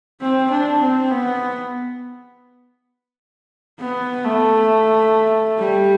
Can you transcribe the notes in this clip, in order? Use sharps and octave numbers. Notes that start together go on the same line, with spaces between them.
C4
D4
C4
B3
B3
A3
G3